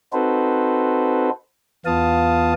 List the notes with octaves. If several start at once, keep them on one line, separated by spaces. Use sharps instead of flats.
C4 D#4 F#4 A4 B4 C5
E2 B3 F4 F5 A5 D#6